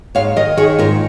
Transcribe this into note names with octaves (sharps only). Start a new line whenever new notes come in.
G#2 C#5 F5
D#3 A#4 D#5
D#3 G#4 C#5
G#2 F4 A#4